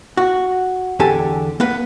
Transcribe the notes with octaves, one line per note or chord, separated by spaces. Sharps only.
F#4
E2 D3 G4 A4 G#5
A#3 B3 B4